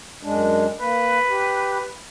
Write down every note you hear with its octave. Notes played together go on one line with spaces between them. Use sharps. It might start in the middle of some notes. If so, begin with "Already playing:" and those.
F#2 G#3 D4
A#3 B4
G4